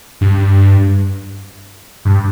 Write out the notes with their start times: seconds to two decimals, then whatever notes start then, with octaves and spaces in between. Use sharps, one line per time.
0.21 G2
2.05 G2